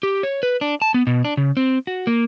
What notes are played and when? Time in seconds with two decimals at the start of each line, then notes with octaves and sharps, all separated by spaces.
0.03 G4
0.23 C#5
0.43 B4
0.61 D4
0.82 A5
0.94 B3
1.07 B2
1.25 D4
1.37 C#3
1.57 C4
1.87 F#4
2.07 A#3